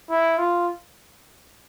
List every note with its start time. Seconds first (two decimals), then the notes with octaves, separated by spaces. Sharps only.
0.10 E4
0.38 F4